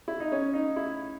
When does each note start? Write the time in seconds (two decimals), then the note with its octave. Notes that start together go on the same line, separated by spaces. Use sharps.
0.08 E4
0.20 D#4
0.32 C#4
0.54 D#4
0.76 E4